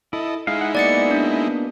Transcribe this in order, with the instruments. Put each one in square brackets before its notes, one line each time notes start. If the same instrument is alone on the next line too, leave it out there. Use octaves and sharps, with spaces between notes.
[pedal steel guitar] E4 [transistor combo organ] A4 D#5
[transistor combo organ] G#3 D#4 E4 [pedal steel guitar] F5
[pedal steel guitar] F#5
[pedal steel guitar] A#3 B3 F#4 [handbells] D5 A6 C#7
[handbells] D4